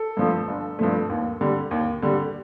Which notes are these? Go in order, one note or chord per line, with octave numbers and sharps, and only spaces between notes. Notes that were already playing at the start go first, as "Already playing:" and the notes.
Already playing: A4
G2 F3 A3
G1
G2 F3 A3
D#2
D3 G3
D#2
D3 G3